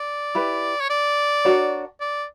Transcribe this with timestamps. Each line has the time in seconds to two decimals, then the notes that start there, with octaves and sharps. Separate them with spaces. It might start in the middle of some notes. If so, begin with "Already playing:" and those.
Already playing: D5
0.35 E4 G4 B4
0.80 C#5
0.90 D5
1.45 D4 F#4 A#4 C#5
2.01 D5